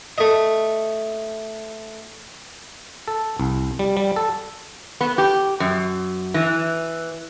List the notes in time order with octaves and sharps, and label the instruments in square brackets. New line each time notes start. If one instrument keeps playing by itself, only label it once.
[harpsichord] A3 D#5
[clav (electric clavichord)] A4
C2
G3
G3
A4
[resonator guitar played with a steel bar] B3
G4
F#2
E3